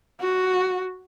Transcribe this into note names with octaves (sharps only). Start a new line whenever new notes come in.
F#4